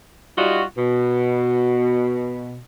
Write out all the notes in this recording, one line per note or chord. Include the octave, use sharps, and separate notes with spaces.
G3 D#4 F4 F#4
B2